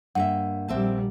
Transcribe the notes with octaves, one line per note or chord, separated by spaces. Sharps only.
G2 A#3 E5 F#5
A#1 G3 C4 E5 A5